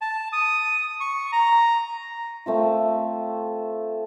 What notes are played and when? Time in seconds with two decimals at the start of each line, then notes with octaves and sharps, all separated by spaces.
0.01 A5
0.33 D#6
1.00 C#6
1.32 A#5
2.46 A3 C4 F4